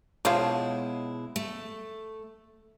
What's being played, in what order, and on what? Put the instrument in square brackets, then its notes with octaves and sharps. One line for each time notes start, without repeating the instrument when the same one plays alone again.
[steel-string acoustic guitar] B2 G#3 E4 [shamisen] F3 F4 [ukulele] C#5 A5
[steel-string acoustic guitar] A3